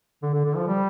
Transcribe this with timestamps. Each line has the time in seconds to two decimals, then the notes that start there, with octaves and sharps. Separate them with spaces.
0.23 D3
0.34 D3
0.45 D3
0.56 F3
0.68 G3